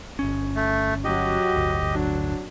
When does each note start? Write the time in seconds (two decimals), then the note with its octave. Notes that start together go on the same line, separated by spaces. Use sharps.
0.19 G1 C#4
0.56 A3
1.04 F#3 F#4 G4 D#5
1.54 D1 G1 D2
1.91 F#3 D4